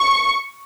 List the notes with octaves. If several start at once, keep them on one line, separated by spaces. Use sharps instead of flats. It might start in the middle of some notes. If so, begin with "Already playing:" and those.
Already playing: C#6